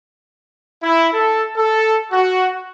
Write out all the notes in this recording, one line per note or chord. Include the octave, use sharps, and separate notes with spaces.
E4
A4
A4
F#4